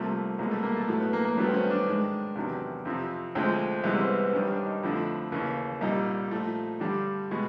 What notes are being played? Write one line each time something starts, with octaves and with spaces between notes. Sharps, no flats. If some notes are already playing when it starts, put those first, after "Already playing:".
Already playing: C2 C3 F3 A3 A#3
C2 B2 G#3 A#3
A3
A#3
A3
A2 F#3 A3
B3
A#3
A#3
G2 D#3 F#3 A3 B3
C4
C#4
D4
G#2 D#3 G#3
E2 C3 D#3 F#3 D4
F2 C3 F3
D2 D3 F3 G#3 C4
C2 C3 E3 G#3 B3
C4
B3
G2 D#3 G3 C#4
D4
D#4
F2 D3 F3 A3 E4
D#2 C#3 E3
C2 A#2 G3 D#4
A#2 F3 A3
G2 D3 G3 D4
B2 G#3